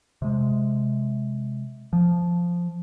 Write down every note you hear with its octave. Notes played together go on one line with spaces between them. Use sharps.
C3 G#3
F3